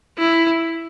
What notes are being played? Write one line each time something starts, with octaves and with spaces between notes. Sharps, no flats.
E4